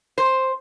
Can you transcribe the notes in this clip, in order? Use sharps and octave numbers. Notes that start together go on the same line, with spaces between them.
C5